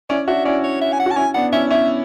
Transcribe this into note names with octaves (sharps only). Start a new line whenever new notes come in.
C#4 E4 D5
D4 F#4 E5
C#4 E4 D5
C#5
E5
G#5
F#5
F#4 A5
C#4 E4 G#5
B3 D4 F#5
C#4 E4 E5
C#4 E4 E5